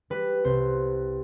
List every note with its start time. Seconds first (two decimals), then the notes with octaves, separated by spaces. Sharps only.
0.10 G3 B4
0.44 C2 C5